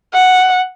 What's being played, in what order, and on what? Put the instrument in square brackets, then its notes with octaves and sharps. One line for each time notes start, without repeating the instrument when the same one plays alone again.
[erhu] F#5